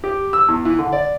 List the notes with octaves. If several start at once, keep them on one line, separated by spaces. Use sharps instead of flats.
G4
E6
E2
E3
D3
D5